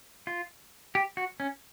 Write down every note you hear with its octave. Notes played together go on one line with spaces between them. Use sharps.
F4
G4
F#4
C#4